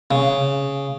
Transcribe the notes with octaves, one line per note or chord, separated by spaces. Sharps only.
C#3